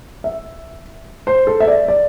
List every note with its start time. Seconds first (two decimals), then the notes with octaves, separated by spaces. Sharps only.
0.24 E5
1.27 C5
1.47 A4
1.60 E5
1.67 D5
1.88 D5